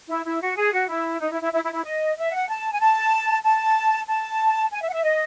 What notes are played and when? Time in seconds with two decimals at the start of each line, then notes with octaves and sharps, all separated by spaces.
0.08 E4
0.25 E4
0.41 F#4
0.57 G#4
0.73 F#4
0.88 E4
1.21 D#4
1.32 E4
1.42 E4
1.53 E4
1.63 E4
1.73 E4
1.84 D#5
2.17 E5
2.32 F#5
2.48 A5
2.73 G#5
2.80 A5
3.44 A5
4.08 A5
4.71 G#5
4.82 E5
4.89 F#5
4.93 E5
5.04 D#5